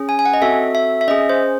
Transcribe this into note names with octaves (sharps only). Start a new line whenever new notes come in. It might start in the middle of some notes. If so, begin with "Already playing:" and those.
Already playing: C#4 G#4
G#5
G#5
F#5
D#5
C4 F#4 A4 E5
E5
E5
C#4 G#4 D#5
C5